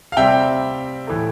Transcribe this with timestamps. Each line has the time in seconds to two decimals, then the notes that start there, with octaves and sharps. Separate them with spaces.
0.12 F5
0.17 C3 G3 C4 E5 G5
1.07 A2 E3 A3